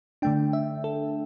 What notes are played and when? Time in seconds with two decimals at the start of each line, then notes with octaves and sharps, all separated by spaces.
0.22 D3 A3 D4 G5
0.53 E5
0.84 A4